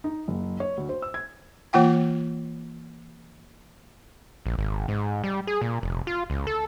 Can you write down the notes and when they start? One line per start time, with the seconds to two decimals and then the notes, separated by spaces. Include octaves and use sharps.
0.04 D#4
0.28 F#1
0.60 C#5
0.77 D2
0.89 C5
1.02 E6
1.14 G#6
1.73 E3 A#3 F4 F#5 G5
4.46 A#1
4.58 G#1
4.88 G#2
5.24 G3
5.47 G#4
5.61 A#2
5.83 F1
6.07 F4
6.30 C#2
6.47 A4